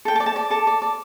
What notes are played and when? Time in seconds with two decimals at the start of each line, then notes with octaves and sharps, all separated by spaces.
0.05 A4 G5
0.16 A5
0.20 D5
0.26 A5
0.36 D5
0.50 A4 A5
0.67 D5
0.82 D5